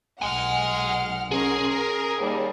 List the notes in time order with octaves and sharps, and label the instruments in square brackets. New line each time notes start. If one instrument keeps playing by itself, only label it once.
[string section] B1 F#5 F6 [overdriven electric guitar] D#5 G#5
[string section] C#4 A#4 C6 [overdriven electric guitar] G#4
[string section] A#4
D#2 G3